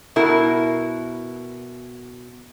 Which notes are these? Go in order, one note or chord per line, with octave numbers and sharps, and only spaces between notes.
B2 E4 A#4